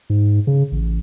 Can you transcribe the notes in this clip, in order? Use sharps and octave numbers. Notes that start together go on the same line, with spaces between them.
G#2
C#3
A1